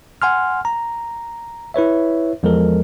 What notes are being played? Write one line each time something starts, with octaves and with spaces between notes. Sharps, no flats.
F#5 G#5 C6 F6
A#5
E4 B4 C#5 E5
E2 F3 G#3 A4 A#4